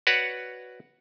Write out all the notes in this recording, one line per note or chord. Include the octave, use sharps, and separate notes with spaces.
F#4 B4 C#5 D5 F#5